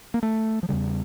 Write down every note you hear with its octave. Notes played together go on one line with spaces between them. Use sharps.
A#3
A3
F3
E2 C#3 G3